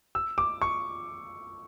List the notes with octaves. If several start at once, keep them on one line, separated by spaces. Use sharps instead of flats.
E6
D6
C#6